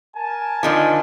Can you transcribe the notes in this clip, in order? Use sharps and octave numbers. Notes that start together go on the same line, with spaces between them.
A#4 G#5 A5
D3 D#3 F3